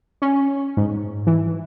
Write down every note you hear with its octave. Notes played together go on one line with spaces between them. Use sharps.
C#4
G#2
E3